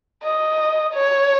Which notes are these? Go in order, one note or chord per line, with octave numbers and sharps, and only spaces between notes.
D#5
C#5